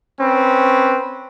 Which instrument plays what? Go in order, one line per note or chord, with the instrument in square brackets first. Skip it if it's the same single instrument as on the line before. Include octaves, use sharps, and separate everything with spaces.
[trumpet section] C4 C#4 B4